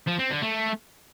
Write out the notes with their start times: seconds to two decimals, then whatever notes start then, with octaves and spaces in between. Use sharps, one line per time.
0.07 F3
0.19 C4
0.30 D3
0.42 A3